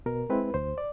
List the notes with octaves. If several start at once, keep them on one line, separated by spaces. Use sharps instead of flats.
B2 A#4
G#3 C4 E4 B4
D2 C5
D5